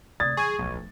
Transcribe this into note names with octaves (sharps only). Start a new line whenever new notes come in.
D2 C3 D5 D#6 G#6 A6
B1 E3 G#4 C#6 G#6 D#7
D1 B1 F3